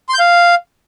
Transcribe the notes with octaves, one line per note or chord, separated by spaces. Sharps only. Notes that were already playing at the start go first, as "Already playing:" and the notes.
C6
G6
F5